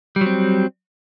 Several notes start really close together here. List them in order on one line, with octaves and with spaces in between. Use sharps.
G3 F#3 C4